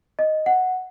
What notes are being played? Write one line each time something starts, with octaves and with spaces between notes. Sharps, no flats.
D#5
F#5